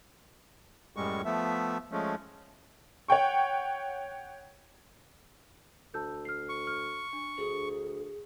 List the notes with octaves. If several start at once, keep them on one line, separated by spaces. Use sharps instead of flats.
F#2 A2 G3 G#3 C#6
F3 A3 B3 E5
F3 G#3 A3 C#4
C#5 F#5 G5 C#6
D2 A5 E6 G6
F6 C7
C#6
F6
D4
D2 G#4